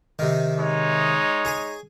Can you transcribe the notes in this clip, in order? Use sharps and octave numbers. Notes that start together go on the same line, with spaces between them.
C3 D#3
G#3 D#4 C#5
G#4 G#5